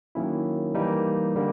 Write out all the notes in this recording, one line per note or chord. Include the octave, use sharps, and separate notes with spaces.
D#3 F#3 A#3 C#4 E4
E3 G3 A#3 D#4
D3 G3 A#3